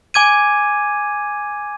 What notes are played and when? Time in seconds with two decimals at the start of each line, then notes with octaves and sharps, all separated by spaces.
0.14 G#5 D6 G#6 D#7